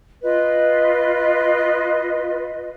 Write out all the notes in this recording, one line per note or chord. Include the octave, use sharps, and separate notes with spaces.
F4 B4 D#5